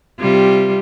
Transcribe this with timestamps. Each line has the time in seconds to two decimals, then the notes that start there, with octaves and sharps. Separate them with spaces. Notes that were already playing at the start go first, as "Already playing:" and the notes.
0.19 C3 G3 F4